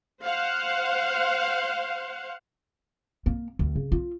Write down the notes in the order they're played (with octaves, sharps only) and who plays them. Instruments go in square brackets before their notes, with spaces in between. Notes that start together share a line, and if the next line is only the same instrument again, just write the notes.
[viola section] C5 F5 F#5
[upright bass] A#3
D2
C#3
F4